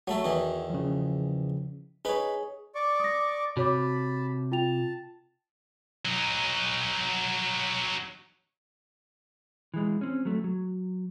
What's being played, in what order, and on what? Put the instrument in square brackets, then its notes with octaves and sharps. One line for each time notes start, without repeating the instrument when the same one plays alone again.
[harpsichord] F#3 A3 A4 [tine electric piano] F#4
[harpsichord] E2 D#3 E3
[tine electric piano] C#3 F3
[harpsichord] D#4 B4 [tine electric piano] G#4 C#5
[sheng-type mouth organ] D5 C#6 D6
[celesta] D#6 A#6
[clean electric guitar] C3 [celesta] F#4 C#5 D6 [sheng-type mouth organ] A5 B5
[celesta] F4 G5 F7 [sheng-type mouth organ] A5
[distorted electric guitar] F#3 D#4
[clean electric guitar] E3 G#3
C4 C#4
F#3 A3
F#3